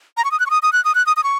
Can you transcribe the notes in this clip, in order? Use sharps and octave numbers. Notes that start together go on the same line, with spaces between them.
A#5
C#6
D#6
F#6
C#6
D#6
D#6
F#6
D#6
F#6
D#6
D#6
C#6